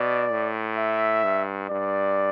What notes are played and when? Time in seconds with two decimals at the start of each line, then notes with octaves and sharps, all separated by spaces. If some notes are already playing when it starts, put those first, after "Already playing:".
Already playing: B2 D5
0.31 A2
0.78 E5
1.24 G2
1.70 G2 D5